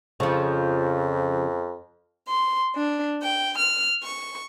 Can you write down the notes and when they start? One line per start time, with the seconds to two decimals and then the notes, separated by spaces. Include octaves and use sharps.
0.20 F2 C#3 F3
2.28 C6
2.74 D4
3.21 G5
3.57 F6
4.02 C#6